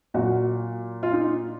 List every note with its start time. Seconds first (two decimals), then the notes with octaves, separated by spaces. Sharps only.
0.14 A#2 F#3 F#4
1.03 F4
1.13 D#4